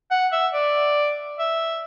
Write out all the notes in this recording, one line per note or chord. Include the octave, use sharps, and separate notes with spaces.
F#5
E5
D5
E5